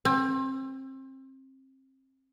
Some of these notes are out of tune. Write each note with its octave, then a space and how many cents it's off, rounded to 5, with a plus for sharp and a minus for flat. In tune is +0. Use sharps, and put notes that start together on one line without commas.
C4 +30